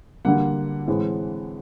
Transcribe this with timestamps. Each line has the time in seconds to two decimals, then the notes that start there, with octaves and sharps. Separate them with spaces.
0.25 D3 G3 A#3 F#5
0.87 A2 E3 G#3 C4